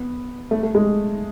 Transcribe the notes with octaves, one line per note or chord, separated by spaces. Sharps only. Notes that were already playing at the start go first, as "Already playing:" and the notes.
Already playing: B3
A3
A3
G#3